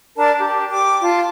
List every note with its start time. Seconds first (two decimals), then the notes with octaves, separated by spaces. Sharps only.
0.17 D4 A#4 D5 A5
0.39 G4
0.70 G5 D6
1.02 F4 A5